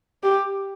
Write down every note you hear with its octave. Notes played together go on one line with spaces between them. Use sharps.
G4